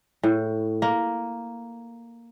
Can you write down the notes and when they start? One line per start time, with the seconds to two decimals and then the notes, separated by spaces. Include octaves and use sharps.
0.23 A2
0.82 A#3